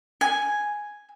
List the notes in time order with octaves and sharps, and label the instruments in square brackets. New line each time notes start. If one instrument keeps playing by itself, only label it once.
[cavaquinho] G#5